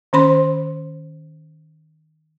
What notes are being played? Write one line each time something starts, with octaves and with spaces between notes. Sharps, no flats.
D#3 C#4 C5 B5 C6